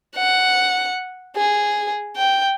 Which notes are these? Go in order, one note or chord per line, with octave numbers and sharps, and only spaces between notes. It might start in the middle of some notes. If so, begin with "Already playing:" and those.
F#5
G#4
G5